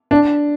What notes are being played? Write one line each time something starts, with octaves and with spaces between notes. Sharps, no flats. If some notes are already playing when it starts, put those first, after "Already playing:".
D4